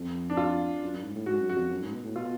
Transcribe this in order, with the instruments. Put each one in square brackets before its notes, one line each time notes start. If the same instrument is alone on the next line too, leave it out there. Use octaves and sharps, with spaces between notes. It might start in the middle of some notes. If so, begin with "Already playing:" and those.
Already playing: [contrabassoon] F2
[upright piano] D4
F4
[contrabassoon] F#2
F#2
G#2
A2
[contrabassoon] G#2 [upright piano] F#4
[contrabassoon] F#2
[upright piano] F#4
[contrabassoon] F2
F#2
G#2
B2
A2
[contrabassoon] B2 [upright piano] F4